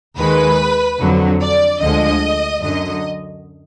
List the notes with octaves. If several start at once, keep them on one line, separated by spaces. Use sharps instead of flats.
D#2 D#3 G#3 B4
F2 D3 F#3
D5
D2 D3 F3 G#3 D#5
F#2 D3 F#3 D#5